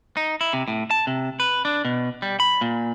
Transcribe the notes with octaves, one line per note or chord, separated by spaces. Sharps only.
D#4
E4
C3
A2
A5
C3
B4
D4
B2
G3
B5
A#2